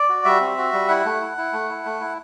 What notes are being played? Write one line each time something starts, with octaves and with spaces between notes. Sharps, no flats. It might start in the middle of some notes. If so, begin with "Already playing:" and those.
Already playing: D5
F#4
G3 E5
C4
F#4
G3
E4 F#5
A3
E4
E4
A3
E4
A3
E4